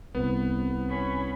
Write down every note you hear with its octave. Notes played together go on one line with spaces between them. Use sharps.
C2 B3
C#4 B5